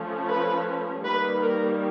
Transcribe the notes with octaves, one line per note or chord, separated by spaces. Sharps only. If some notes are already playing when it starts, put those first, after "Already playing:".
Already playing: F3 A3 C#4
B4
D#3 G3 A#3 B4
A#4